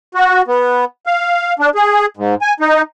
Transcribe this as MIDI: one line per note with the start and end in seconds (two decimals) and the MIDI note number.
0.15 0.42 66
0.48 0.85 59
1.06 1.54 77
1.59 1.69 62
1.75 2.06 68
2.17 2.35 44
2.42 2.53 80
2.60 2.82 63